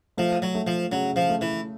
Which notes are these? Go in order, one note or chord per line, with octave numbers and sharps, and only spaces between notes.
F3 A3
F#3
A3
F3
C#3 F#3
F3
A3
E3